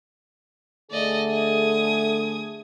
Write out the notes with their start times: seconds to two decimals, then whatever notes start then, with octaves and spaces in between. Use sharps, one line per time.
0.91 D3 A3 G#4 D5 D#5
1.30 D#6 G#6